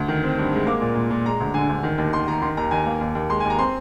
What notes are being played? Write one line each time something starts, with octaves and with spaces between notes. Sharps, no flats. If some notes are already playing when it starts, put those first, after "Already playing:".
Already playing: D2
D#3
C4
G2
G#3
A#3 D6
A#2
A#2
A#2
G#3 A#5
D2
D3 G#5
D2
D#3
D#2
D#3 C6
D#3 A#5
D#3 C6
D#2 A#5
D#2 G#5
A#3
D#2
D#2
G#3 C6
G#5
D#2
A#5
C4 C6